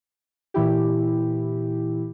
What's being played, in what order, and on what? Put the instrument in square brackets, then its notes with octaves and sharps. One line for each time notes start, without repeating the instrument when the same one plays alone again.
[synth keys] A#2 E3 E4 G4